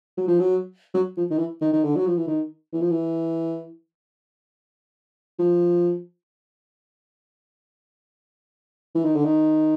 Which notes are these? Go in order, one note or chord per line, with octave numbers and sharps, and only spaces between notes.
F#3
F3
F#3
F#3
F3
D#3
E3
D#3
D#3
D3
F#3
F3
E3
D#3
E3
F3
E3
F3
E3
D#3
D3
D#3